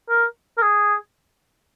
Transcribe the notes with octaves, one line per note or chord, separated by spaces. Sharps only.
A#4
A#4
G#4